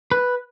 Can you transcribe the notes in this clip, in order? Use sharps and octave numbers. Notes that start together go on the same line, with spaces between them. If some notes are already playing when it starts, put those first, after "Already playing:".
B4